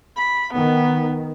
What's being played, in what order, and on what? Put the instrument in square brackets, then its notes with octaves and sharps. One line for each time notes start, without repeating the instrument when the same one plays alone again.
[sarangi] B5
[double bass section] D#3 [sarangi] B3